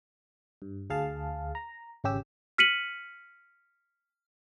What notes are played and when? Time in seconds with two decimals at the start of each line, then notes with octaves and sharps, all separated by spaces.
0.62 G2
0.90 D2 G#4 F5 A5
1.55 A#5
2.04 G#1 C#3 C#4 G4 E6
2.58 F6 B6 C#7 D#7 F#7